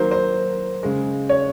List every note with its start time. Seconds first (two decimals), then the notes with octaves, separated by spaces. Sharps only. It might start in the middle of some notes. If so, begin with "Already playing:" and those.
Already playing: D#3 F#3 A#3 C5
0.11 C5
0.83 C#3 G#3
1.29 C#5